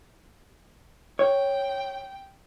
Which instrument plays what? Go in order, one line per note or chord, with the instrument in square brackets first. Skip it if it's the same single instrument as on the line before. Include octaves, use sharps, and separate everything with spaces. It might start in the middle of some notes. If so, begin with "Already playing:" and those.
[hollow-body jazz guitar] C#5 [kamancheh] G5